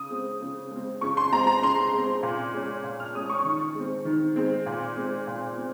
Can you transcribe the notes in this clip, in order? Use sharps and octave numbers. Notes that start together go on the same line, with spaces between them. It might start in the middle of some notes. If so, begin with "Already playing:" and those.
Already playing: C#3 D#6
G#3 C4
C#3
G#3 C4
C#3 C#6
C6
G#3 C4 A#5
A#5
C#3 C6
G#3 C4
A#2
G#3 C#4
A#2
F6
G#3 C#4 D#6
C#6
D#3
G#3 C4
D#3
G#3 C4
A#2
G#3 C4
A#2
C4